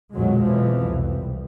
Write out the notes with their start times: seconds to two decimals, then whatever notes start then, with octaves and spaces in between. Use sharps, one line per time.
0.15 B1 F2 A#2 D3 F#3 G#3
0.44 F2 B2 E3 F3
0.83 C2